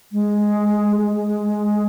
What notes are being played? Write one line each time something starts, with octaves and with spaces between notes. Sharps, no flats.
G#3
G#3